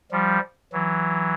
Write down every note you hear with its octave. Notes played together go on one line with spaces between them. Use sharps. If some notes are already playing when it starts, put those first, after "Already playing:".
F3 G3
E3 F#3